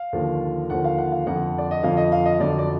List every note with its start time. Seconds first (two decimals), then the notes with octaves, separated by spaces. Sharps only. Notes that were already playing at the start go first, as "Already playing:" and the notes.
Already playing: F5
0.13 D#2 D3 F3
0.70 D#2 D3 F3 F#5
0.84 F5
0.98 F#5
1.12 F5
1.27 F2 D3 F3 F#5
1.58 D5
1.71 D#5
1.83 F2 D3 F3 F5
1.97 D#5
2.12 F5
2.25 D#5
2.40 F2 D3 F#3 D5
2.59 D5